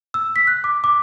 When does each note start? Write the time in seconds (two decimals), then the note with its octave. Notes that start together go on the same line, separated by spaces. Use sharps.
0.14 E6
0.36 B6
0.47 F#6
0.64 D6
0.84 D6